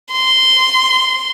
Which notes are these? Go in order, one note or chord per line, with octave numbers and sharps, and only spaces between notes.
C6